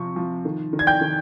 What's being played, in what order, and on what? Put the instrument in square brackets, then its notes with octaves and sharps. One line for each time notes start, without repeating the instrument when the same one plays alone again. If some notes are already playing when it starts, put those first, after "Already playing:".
Already playing: [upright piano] C3 F3 C#6
F3
D#3
D#3
G#6
G5 G6
D#3